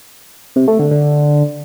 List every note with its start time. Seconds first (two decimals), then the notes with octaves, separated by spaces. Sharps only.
0.56 C3
0.68 A3
0.79 D3
0.91 D3